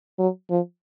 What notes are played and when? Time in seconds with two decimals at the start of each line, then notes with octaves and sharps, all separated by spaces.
0.19 F#3
0.50 F3